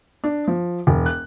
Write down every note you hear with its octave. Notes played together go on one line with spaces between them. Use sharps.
D4
F3
E1
F#6